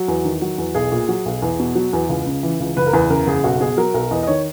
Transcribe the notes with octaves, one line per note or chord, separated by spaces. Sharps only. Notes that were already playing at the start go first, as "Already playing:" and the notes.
Already playing: F#3
E2
D#3
F#3
E2
B1 G#4
A#2
F#3
B1
E2
B2
F#3
E2
C#2
C#3
E3
C#2
F#1 B4
A#4
E2 B4
C#3 A#4
F#1 G#4
B1 F#4
B2 G#4
F#3 A#4
B1 A#4
E2 D#5
D#5
D#3 C#5